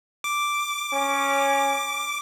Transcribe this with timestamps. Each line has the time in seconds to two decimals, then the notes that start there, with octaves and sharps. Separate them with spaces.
0.24 D6
0.93 C#4